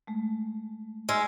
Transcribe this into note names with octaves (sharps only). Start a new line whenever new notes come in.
G#3 A3
G#3 D#4 E6 F6 G#6